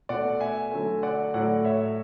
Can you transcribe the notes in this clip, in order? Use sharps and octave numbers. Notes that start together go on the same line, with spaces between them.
B2 A3 D5 F#5
E5 G#5
D3 F#3 A3
D5 F#5
A2 F#3 A3 D5 F#5
C#5 E5